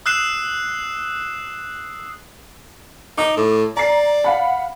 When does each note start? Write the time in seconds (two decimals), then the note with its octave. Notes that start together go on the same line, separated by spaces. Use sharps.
0.06 D#6 E6 F#6 C7 E7
3.18 D#4 D6
3.37 A2
3.77 D5 A#5 C7
4.24 F5 F#5 B5